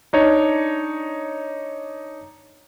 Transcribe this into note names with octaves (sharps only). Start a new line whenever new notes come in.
D4 D#4 C#5